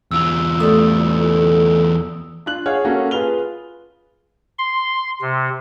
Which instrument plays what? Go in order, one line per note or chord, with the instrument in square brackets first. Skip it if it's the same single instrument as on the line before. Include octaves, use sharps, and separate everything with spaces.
[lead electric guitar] E2 F4 [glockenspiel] E6
[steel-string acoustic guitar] G3 A3 [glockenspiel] D#6
[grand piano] D4 F4 F#6 F#7
G#4 C#5 F5 F#5 F6
A#3 C#4 F#4 A4
F4 G#4 B4 F6 F7 G7
[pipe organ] C6
C3